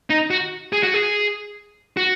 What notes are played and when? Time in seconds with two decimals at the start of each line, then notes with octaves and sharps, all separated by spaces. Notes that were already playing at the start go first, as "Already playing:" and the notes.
0.10 D#4
0.30 F#4
0.73 G#4
0.83 F#4
0.94 G#4
1.97 F#4